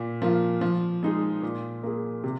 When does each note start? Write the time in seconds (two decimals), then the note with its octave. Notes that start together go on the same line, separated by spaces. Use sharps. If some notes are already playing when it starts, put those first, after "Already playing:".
Already playing: A#2
0.22 F3 A#3 F4
0.61 F3
1.03 G#3 D#4 G#4
1.42 A#2
1.83 A#3 G#4
2.24 C3